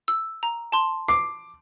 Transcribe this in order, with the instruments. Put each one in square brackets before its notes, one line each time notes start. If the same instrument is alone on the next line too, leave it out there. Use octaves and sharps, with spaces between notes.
[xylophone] E6
A#5
A5 C6
[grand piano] D6 [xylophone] C7